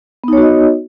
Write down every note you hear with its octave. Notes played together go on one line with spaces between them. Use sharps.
B3 D#4 F#4 C#5 D#5